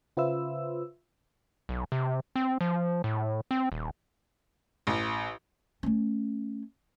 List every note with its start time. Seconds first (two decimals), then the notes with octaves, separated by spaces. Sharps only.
0.17 C#3 F4 B4 C5 E5 E6
1.69 B1
1.92 C3
2.36 C4
2.61 F3
3.04 A2
3.51 C4
3.72 D#1
4.87 A1
5.83 A3 C#4